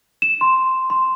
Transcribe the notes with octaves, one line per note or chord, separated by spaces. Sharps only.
E7
C6
C6